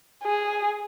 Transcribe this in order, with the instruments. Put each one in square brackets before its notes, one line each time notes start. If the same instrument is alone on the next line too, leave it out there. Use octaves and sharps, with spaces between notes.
[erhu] G#4